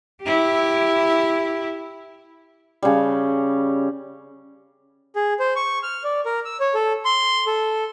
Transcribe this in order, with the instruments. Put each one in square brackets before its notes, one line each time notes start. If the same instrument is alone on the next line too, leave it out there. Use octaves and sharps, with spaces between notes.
[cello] E4 G4
[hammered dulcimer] C#3 G3
[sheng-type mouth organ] G#4
C5
C#6
F6
D5
A#4
E6
C#5
A4
C6
A4